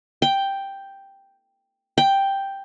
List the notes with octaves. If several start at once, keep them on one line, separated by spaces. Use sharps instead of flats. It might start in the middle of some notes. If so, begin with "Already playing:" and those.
G5
G5